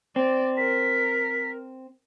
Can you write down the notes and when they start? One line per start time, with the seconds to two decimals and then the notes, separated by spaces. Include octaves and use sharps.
0.16 C4 D5
0.57 A#4 B6